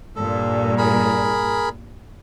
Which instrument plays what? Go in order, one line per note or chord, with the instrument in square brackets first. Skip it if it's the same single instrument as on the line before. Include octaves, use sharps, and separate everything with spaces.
[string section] G2 A#2 [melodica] A4
[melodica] G#4 A#4 B5